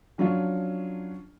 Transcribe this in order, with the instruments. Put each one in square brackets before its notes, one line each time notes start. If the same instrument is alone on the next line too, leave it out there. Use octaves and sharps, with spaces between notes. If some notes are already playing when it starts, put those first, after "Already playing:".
[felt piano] F3 F#3 C#4 D4 F4